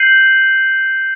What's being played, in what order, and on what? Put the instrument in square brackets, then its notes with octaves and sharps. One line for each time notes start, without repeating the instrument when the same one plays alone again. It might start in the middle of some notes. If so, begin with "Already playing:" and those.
Already playing: [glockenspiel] G6 C7 D#7 F#7